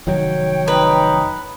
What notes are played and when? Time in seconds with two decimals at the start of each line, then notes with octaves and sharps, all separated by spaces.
0.07 F1 D#3 F#3 C#5 G5
0.68 D#4 B4